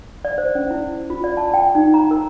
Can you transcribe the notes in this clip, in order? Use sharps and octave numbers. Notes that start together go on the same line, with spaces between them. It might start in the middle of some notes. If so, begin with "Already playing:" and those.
D5
C5
C#4
E4
F4
D5
A5
G5
D#4
A#5
A#4